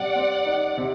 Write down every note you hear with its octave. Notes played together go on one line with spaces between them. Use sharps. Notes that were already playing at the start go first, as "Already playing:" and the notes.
Already playing: C3 G3 D5 F#5
C4
D#4
C3